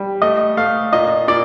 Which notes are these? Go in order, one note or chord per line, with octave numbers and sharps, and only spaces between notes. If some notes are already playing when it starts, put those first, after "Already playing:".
Already playing: G3
A3 D#5
A3 F5
A#2 D#5
A#2 D5